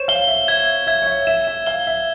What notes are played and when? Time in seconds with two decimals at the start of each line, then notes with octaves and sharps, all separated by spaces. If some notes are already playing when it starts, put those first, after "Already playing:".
Already playing: C5 C#5 E7
0.08 F5 G7
0.28 E5
0.48 E5 G#6
0.87 E5 G#6
1.02 C#5
1.07 E5
1.27 E5 E7
1.47 E5
1.67 F5 G7
1.87 E5